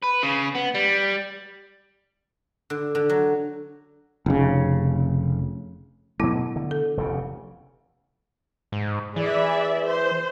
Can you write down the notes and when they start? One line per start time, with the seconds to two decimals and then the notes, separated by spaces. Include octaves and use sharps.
0.04 B4
0.23 C#3
0.55 B3
0.75 G3
2.70 D3
2.95 D3
3.10 F#3
4.26 F1 C#3
6.20 B2 F#3 A3 B3 E4
6.56 D3
6.71 A4
6.97 F1 E2 C#3
8.72 G#2
9.16 E3 G#4 D5 E5
9.88 C5